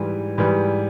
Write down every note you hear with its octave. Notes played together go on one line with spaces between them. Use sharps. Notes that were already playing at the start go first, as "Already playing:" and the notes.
Already playing: G#2 E3 G3
G#2 E3 G3